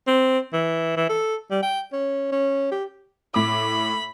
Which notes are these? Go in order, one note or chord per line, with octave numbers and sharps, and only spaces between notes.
C4
E3
E3
A4
G3
G5
C#4
C#4
G4
A2 B5 D6